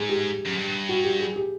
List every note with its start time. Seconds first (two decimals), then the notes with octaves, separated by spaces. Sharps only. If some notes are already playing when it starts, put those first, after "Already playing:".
Already playing: G#2 G#4
0.09 G4
0.45 F#2
0.57 G2
0.89 F#4
1.04 G4
1.20 G#4
1.36 G4